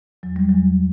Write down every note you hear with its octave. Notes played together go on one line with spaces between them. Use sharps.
E2 F#3
G3
F#3
E2